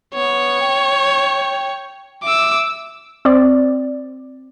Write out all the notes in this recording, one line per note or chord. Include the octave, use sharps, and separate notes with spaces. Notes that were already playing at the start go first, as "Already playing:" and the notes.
B3 C#5
G5
E5 D6 E6
C4 D5